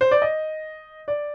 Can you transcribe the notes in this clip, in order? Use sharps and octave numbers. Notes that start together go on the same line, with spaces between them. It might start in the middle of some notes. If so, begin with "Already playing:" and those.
C5
D5
D#5
D5